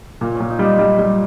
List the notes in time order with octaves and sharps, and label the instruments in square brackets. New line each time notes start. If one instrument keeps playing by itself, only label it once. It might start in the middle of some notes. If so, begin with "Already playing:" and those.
[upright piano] A#2 [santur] A#3
[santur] C#4
[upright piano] A#2
[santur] D#4
[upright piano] G3
[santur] D#4
[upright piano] G3
G3